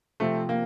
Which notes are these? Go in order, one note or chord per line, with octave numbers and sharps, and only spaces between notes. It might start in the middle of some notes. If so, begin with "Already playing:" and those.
C3 F3 A3 C4
A#3